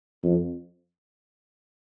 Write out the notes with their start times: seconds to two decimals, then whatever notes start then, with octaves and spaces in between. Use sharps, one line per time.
0.23 F2